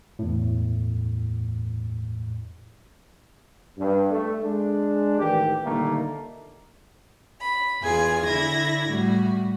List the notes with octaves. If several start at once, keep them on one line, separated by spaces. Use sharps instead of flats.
E2 A2
G2
A3
G#3 D4
A1 D#3 E3 G4
A#2 D3 D#3 G3 A3 A#3
B5
E2 F4 G#4 G#5 G#6
D3 E4 G#6 A#6
A2 G3 F#4